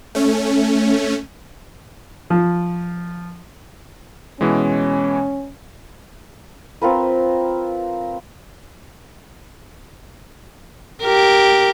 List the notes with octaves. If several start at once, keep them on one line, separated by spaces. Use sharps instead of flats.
A3 C#4
F3
B2 E3 G#3 C#4
C4 F4 A#4 B4
G4 A#4